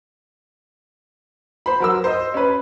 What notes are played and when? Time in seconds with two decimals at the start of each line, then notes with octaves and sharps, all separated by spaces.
1.66 C5 B5
1.80 F#3 A#4 E6
2.04 C5 D#5
2.34 C#4 B4